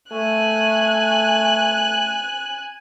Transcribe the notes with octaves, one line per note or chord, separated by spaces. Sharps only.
A3 G#5 F#6